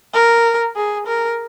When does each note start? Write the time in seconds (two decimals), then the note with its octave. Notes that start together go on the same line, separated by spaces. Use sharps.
0.14 A#4
0.76 G#4
1.07 A#4